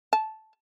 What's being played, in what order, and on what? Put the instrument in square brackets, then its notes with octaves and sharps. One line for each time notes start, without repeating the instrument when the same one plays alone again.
[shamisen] A5